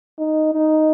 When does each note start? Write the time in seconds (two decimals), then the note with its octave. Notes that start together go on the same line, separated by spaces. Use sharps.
0.19 D#4
0.53 D#4